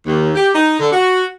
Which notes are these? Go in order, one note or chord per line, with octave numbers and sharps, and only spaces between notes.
D#2
G4
D#4
D3
F#4